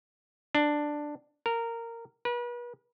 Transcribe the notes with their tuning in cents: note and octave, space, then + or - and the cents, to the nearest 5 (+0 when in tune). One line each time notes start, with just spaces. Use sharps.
D4 +10
A#4 -15
B4 -40